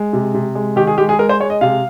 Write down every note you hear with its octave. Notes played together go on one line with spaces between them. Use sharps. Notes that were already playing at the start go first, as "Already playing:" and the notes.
Already playing: G#3
C3
C3
G#3
D#3 G4
G#4
G#3 G4
G#4
G#3 A#4
C5
G#3 C#5
D#5
C3 F5